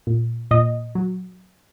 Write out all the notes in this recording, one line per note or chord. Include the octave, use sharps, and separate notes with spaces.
A#2
A#2 D#5
F#3